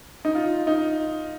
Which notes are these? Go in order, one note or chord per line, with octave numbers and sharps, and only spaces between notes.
D#4
F4
D#4